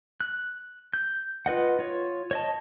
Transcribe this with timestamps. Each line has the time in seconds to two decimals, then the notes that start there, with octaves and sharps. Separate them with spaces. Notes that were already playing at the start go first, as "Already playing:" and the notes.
0.20 F#6
0.93 G6
1.46 F4 B4 D#5 F#5
1.79 F4 C#5
2.31 C#5 D#5 A5